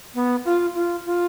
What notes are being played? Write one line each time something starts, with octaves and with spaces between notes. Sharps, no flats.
B3
F4
F4
F4